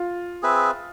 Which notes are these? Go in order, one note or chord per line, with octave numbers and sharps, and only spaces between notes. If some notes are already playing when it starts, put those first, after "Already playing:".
Already playing: F4
C4 G#4 B4 E5